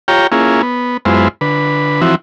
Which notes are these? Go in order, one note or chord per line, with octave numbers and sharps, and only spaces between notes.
F4 G4 C#5 G5 A#5
A#3 C#4 E4 F4 G#4
B3
F#2 G#3 B3 E4 F4 C5
D3 B4
E3 F3 C4 E4 F#4